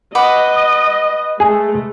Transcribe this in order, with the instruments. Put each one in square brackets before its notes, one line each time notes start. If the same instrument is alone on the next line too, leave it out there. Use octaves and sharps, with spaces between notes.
[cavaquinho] B4 F#5 D6 [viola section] D#5
[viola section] G#3 A3 [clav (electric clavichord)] G#4